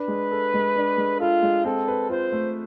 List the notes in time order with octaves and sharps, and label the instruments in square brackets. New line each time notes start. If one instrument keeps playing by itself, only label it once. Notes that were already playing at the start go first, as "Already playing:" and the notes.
Already playing: [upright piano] D4 [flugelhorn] B4
[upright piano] G#3
A4
G#3
D4
G#3
[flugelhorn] F4 [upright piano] A4
[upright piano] G#3
[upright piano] C4 [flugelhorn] A4
[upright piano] B4
[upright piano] F4 [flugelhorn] C5
[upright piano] A3